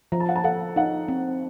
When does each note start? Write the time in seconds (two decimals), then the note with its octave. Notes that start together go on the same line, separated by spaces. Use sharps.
0.12 F3 A#5
0.20 A5
0.29 F#5
0.36 A5
0.44 A4 F#5
0.76 D#4 F#5
1.08 C4